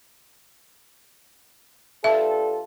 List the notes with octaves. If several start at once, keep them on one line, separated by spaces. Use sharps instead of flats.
G2 F4 A4 E5